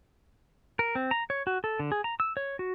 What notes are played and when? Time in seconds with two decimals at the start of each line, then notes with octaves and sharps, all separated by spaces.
0.79 A#4
0.95 C4
1.11 A#5
1.30 C#5
1.47 F#4
1.64 A4
1.80 D3
1.92 G#4
2.04 A#5
2.20 E6
2.37 C#5
2.59 F#4